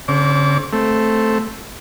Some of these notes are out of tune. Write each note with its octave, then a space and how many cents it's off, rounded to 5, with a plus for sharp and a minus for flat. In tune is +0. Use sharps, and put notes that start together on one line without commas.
D3 -45 C4 +35 D6 -30
A3 +0 C4 +0